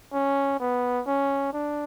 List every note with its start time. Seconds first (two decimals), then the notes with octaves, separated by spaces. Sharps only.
0.13 C#4
0.60 B3
1.07 C#4
1.53 D4